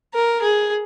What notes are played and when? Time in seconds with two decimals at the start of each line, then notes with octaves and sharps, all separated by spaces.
0.14 A#4
0.42 G#4